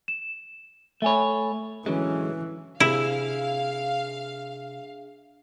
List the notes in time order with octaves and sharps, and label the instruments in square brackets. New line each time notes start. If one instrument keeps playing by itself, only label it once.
[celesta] E7
[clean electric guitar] A3 C#5 [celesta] E5 G#5 B5
[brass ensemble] A2 C#4 [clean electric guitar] D3 F#3 G#3 [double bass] E3
[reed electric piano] C3 E6 [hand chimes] D4 G#4 E5 [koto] E4 [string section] F5